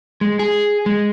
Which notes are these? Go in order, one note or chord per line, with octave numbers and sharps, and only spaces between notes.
G#3
G#4
G#3